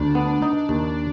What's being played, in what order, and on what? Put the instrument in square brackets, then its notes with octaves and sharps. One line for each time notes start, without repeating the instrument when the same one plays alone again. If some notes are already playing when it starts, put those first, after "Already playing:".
Already playing: [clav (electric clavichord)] D2 [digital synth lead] D4
[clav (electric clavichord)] B3
D#4
D#2